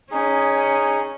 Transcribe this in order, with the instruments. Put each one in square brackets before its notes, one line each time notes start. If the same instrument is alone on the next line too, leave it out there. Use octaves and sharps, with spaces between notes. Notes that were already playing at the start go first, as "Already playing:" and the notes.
[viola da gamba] C#4 [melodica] D#4 G#4